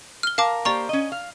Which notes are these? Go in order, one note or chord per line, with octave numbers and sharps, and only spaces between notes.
F6 G7
A#4 F5 A5 D6
A#3 G4 C5 D5 A#5 C#6
C#4 D#5
F5